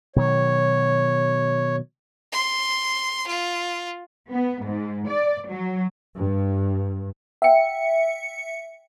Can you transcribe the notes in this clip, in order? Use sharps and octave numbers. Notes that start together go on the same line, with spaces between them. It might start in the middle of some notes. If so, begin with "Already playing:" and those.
B2 D#3 F#3 C#5
C6
F4
B3
G#2
D5
F#3
G2
E5 F#5 G5 C#7